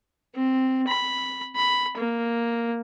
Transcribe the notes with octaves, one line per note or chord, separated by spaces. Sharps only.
C4
B5
B5
A#3